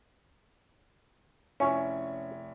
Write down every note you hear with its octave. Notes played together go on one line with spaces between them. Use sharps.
F1 C#4 E4 C#5